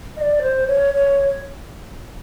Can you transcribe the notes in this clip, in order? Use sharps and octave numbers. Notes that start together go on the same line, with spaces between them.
D#5
D5
C5
C#5
C#5